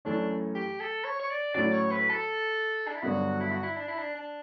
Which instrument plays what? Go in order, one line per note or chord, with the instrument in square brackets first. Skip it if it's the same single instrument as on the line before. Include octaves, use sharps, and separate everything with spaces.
[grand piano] F#2 E3 A3 C#4 [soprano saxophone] D4
[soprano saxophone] G4
A4
C#5
C#5
D5
[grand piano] A2 F#3 C#4 F#4 [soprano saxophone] D5
[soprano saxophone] C#5
B4
A4
D4
E4
[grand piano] G2 D3 F#3 B3 [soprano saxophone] F#4
[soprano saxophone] E4
F#4
E4
D4
E4
D4
D4